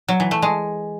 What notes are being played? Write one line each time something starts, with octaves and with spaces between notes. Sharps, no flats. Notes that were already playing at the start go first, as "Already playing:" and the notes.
F#3
E3
A3
G#3